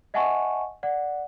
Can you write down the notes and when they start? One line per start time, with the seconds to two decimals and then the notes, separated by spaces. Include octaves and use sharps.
0.14 D#5 E5 F#5 G#5 A5 C#6
0.83 D5 F#5